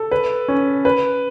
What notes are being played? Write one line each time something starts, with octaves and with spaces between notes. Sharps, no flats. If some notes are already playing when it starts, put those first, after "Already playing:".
Already playing: A4
B4
C#4
B4